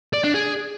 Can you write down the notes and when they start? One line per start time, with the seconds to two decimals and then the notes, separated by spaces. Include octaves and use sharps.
0.13 D5
0.24 D4
0.34 G#4